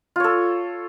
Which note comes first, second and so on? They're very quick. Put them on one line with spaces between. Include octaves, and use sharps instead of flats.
F4 C#5 A4